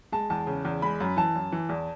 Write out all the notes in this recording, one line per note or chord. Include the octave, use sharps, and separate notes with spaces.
G#3 A5
E2 A5
C#3
E2
G#3 B5
F#2
E3 A5
F#2
E3
E2